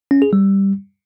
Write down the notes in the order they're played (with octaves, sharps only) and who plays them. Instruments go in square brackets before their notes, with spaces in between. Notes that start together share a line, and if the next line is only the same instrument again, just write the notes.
[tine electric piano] C#4
G#4
G3